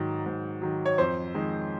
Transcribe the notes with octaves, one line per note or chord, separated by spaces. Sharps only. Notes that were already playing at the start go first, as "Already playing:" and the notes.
Already playing: G#2 D#3 F#3
G#2
D#3 F#3
C#5
F2 C5
D#3 G#3